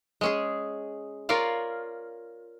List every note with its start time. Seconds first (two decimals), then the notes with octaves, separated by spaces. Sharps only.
0.21 G#3 C#4 G#4
1.29 F4 A#4 C#5 D5 F5